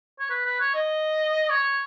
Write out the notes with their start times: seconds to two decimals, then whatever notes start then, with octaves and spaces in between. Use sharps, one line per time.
0.19 C#5
0.30 B4
0.45 B4
0.60 C#5
0.75 D#5
1.50 C#5